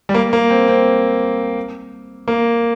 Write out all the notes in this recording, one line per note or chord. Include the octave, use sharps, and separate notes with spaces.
G3
A#3
A#3
C4
C4
A#3